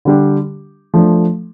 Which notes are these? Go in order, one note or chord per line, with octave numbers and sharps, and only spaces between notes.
D3 G3 D4 G4
F3 A3 D4